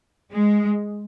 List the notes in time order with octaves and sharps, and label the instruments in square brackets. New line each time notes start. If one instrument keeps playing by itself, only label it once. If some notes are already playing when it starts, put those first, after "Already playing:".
[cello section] G#3